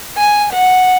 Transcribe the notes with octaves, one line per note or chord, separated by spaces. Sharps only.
G#5
F#5